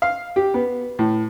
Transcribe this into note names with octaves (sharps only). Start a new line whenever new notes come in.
F5
G4
B3
A2